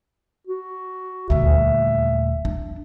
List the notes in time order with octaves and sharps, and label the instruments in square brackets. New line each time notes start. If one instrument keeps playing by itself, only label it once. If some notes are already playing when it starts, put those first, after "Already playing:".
[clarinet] F#4
[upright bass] D#1 D2 [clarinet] E5
[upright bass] D4